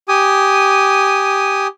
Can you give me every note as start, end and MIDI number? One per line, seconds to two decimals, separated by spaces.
0.09 1.67 67
0.09 1.67 80
0.09 1.67 87